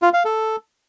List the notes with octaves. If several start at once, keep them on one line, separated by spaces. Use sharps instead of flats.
F4
F5
A4